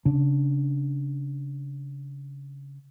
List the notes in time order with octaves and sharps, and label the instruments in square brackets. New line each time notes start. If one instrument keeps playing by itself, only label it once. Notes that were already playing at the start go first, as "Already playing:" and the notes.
[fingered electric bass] C#3 D4